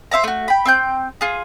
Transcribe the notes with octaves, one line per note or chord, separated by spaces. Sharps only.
C5 E5 F5 A#5
A3 F#4
G5 B5
C4 G5 G6
F4 G#4